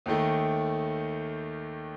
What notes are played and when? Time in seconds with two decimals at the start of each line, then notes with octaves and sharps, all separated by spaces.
0.06 D#2 D#3 A3